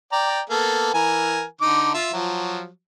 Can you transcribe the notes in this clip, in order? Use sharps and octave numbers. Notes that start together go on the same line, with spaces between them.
D5 G5 A#5
A#3 B3 A4
E3 A#4 G#5
D3 D#4 D6
F4 E5
F3 F#3